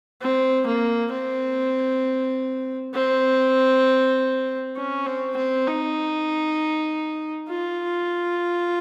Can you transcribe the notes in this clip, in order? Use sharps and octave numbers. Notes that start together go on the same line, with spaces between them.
C4
A#3
C4
C4
C#4
C4
C4
D#4
F4